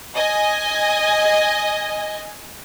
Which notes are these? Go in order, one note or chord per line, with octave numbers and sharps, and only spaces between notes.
D#5 G#5